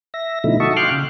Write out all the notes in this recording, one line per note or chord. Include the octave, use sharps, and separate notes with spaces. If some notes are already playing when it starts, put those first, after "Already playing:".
E5 A#6
B2 D3 F3 A3 D#4 E4
F#4 D#5 E5 A5 C#6
F5 G5 C6 D6 F6 F#6
C#3